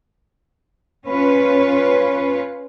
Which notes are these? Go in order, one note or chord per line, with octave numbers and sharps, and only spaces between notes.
C#4 F4 B4 C#5